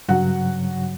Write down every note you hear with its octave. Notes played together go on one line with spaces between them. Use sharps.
G2 C#3 F#3 F#4 F#5